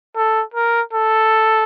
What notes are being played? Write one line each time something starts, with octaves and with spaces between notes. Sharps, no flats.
A4
A#4
A4